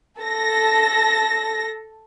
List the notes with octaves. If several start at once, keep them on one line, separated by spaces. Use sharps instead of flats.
A4 A#6